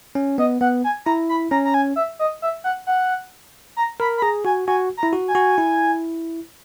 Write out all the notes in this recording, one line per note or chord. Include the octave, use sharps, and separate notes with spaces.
C#4
B3 D#5
B3 F#5
G#5
E4 A#5
B5
C#4 A#5
A#5
G#5
E5
D#5
E5
F#5
F#5
A#5
A#4 B5
B5
G#4 A#5
F#4 G#5
F#4 G#5
A#5
E4
F#4
G#5
F#4
E4